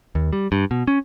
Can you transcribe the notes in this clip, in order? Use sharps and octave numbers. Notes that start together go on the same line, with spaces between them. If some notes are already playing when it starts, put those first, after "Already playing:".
D#2
G3
G2
B2
C#4